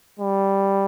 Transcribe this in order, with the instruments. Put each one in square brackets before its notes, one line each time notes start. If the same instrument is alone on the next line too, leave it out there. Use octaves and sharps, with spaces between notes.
[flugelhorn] G3